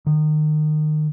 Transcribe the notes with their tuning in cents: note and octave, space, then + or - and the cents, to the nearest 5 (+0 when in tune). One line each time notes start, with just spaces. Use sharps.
D#3 -30